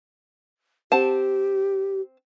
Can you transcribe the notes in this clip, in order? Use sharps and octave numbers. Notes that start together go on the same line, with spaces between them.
C4 G4 F#5 A5